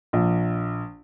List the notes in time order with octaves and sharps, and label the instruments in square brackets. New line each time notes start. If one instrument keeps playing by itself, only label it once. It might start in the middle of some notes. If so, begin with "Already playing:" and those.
[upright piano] A#1